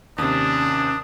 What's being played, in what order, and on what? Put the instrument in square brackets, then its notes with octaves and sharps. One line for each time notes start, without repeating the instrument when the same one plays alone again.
[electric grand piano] D#2 C3 [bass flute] C#4 [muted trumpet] D4 [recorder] D#6